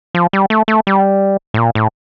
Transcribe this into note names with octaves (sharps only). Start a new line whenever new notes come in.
F3
G3
A3
A3
G3
A2
A#2
A2